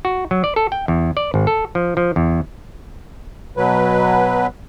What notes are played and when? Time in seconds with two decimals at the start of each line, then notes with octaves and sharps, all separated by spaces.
0.05 F#4
0.31 F#3
0.44 D5
0.56 A4
0.72 G5
0.88 E2
1.17 D5
1.34 G#1
1.47 A4
1.75 F3
1.97 F3
2.16 E2
3.57 B2 F#3 B4